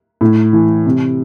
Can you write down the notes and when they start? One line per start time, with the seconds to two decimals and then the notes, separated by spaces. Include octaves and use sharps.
0.21 A2
0.53 E3
0.86 C3